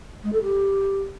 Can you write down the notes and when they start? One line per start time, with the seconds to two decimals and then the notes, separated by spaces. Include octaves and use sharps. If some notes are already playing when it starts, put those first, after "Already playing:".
0.23 G#3
0.32 A4
0.42 G4